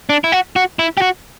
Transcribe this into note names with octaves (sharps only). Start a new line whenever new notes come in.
D4
E4
F#4
F#4
E4
G4
F#4